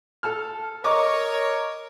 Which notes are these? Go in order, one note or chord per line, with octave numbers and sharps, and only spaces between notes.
A4 A5 F6
A#4 C#5 D#5 C#6 D6